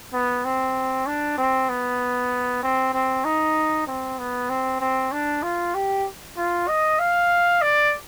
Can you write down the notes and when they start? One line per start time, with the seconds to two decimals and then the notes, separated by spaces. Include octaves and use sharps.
0.13 B3
0.45 C4
1.06 D4
1.38 C4
1.69 B3
2.63 C4
2.93 C4
3.24 D#4
3.87 C4
4.19 B3
4.49 C4
4.80 C4
5.12 D4
5.43 F4
5.74 G4
6.37 F4
6.68 D#5
6.99 F5
7.61 D5